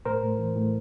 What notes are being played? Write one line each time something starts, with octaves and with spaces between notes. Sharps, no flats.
A2 A#4 C5
A2
E3
A2